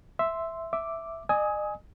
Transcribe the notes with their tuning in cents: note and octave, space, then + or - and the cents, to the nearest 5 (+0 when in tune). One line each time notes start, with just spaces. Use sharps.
E5 +0 C6 +0
E5 +0 D6 +0
D#5 -40 G#5 +0 D#6 +30